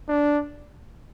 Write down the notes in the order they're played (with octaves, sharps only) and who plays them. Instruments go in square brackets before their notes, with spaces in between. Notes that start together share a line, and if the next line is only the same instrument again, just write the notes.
[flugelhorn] D4